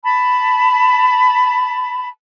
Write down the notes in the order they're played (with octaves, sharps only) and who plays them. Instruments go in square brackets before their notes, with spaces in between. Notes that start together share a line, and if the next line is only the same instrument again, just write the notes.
[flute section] A5 B5